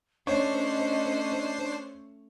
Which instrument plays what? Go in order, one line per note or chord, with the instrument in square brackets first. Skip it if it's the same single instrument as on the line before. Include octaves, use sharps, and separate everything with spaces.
[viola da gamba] A3 C#4 [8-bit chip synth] D4 C5 C7 [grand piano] C#5 [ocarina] D#5